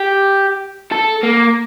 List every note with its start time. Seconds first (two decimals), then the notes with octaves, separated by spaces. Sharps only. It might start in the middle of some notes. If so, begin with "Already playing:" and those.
Already playing: G4
0.92 A4
1.23 A#3